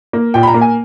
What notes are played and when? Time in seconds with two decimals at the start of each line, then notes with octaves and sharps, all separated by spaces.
0.13 A#3
0.34 A#2 G5
0.43 B5
0.47 A#5
0.54 A#3
0.61 G#5